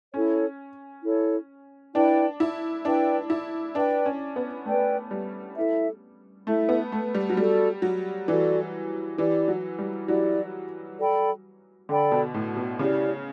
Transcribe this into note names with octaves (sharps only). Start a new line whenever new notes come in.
C#4 E4 A4 C#5
E4 A4 C#5
D4 E4 B4 D5 G5
E4
D4 E4 B4 D5 G5
E4
D4 B4 D5 G5
C#4
B3
A3 B4 D5 G5
G3
E4 A4 E5
A3 E4 A4 E5
B3
A3
G3
F#3
G3 F#4 A4 D5
F#3
E3 F#4 A4 D5
E3 E4 G4 D5
F#3
G3
F#3 E4 G4 D5
A4 D5 G5 B5
D3 A4 D5 G5 B5
B2
A2
B2
C#3 E4 G4 D5